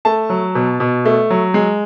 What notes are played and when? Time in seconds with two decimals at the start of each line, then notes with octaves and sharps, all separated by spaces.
0.05 A3 A5
0.30 F#3
0.55 B2
0.80 B2
1.05 A3
1.30 F#3
1.54 G#3